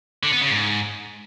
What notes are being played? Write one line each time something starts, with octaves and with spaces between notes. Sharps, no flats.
D3
B3
C#3
G#2